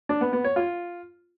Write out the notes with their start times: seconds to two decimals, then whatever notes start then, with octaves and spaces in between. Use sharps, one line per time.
0.09 D4
0.21 B3
0.33 B3
0.44 C#5
0.56 F4